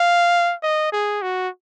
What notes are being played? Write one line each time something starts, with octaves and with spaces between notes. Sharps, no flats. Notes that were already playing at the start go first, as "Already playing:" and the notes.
Already playing: F5
D#5
G#4
F#4